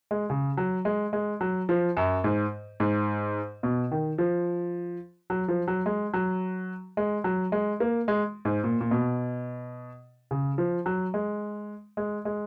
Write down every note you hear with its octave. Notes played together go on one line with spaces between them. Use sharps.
G#3
C#3
F#3
G#3
G#3
F#3
F3
F#2
G#2
G#2
B2
D#3
F3
F#3
F3
F#3
G#3
F#3
G#3
F#3
G#3
A#3
G#3
G#2
A#2
A#2
B2
C#3
F3
F#3
G#3
G#3
G#3